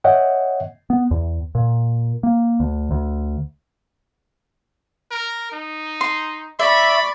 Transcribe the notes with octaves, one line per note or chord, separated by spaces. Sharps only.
C#5 D#5 E5 F#5 G5
B3
E2
A#2
A#3
D2
D2
A#4
D#4
C6
D5 E5 B5 C#6